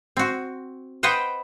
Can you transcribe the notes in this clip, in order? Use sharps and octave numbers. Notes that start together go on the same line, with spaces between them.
C4 F#4
B4 C5 D#5 F#5 G5